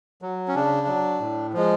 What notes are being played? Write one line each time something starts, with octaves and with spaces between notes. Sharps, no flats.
F#3
C#4
C#3 D4
F#3
A2
F3 G#3